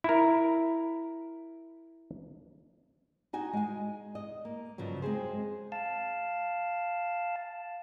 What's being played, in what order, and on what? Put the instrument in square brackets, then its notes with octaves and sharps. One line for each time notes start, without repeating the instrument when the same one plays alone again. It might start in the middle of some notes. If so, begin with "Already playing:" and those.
[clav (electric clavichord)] E4 A#4
[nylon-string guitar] D#4 F#4 G#5
G#3 G#5
D#5
A#3
G2 C#3 F3 F#3
G#3 C4 G#4 C5
[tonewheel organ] F5 A5